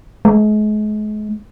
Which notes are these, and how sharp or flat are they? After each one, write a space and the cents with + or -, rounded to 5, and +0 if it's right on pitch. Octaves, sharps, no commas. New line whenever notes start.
G#3 +40